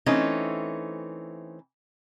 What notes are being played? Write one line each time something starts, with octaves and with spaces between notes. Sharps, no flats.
E3 A3 C4 C#4 D#4